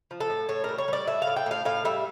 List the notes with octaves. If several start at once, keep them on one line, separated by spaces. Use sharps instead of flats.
F3
A4
A2
A2 C#5
G3 A#4
C#5
G3 D5
A2 E5
F5
A2
G5
A2 F5
A2 F5
G3 E5